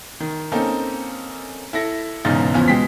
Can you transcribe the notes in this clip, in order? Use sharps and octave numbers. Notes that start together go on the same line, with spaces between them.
D#3
A#3 C4 C#4 D#4 A4
E4 A4 A#6
E1 E2 G#2 C#3 D#4 A6
E2 C#3 E3 F3 B3 C#4
B2 G#3 G5 B6